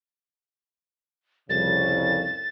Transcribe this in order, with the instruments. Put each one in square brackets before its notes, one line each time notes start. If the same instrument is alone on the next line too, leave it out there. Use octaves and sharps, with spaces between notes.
[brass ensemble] C2 F2 C#3 [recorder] A6